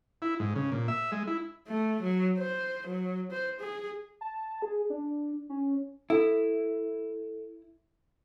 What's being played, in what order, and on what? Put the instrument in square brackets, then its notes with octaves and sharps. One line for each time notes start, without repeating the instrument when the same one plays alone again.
[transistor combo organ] E4
G#2
C#3
A#2
E5
G#3
E4
[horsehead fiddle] A3
F#3
C5
F#3
C5
G#4
[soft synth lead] A5
G#4
D4
C#4
[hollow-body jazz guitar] E4 [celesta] A4